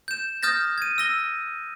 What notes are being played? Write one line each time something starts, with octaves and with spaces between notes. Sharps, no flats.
G6 E7
D#6 F6 G6 A6 A#6
G#6 D#7
E6 A#6 G7